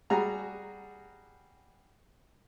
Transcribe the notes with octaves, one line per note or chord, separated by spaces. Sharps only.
G3 F#4 G#4 A#5